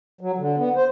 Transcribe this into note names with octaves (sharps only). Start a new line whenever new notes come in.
F#3
D3
B3
C5